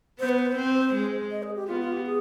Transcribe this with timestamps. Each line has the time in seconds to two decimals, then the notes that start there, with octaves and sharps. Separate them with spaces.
0.19 B3 C5
0.29 B4
0.38 C5
0.56 C4
0.94 G#3
1.31 D#5
1.43 G#4
1.55 G4
1.68 B3 F4
1.81 F4
1.92 G4
2.05 G#4